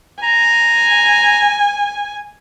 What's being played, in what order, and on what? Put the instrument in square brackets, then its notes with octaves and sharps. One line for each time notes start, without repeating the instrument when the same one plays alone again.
[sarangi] G#5 [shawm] A#5